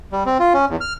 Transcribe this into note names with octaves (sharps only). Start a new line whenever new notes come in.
G3
C4
F4
C#4
E2
F6